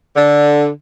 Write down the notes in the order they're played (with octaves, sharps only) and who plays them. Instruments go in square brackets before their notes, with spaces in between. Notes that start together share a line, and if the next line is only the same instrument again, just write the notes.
[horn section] D3